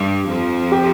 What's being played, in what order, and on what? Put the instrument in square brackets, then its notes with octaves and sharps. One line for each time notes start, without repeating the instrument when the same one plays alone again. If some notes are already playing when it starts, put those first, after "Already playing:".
Already playing: [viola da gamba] G2 G3
F2 F3
[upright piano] G4